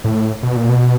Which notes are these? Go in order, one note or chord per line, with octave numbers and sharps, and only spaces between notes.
A2
B2
A#2
B2